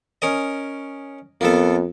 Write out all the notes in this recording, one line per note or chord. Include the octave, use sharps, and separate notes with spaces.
C#4 A#4 D#5
F2 A#3 B3 A4